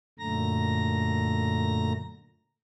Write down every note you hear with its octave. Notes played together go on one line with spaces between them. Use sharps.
F#2 A#2 D3 A3 A#5 A#6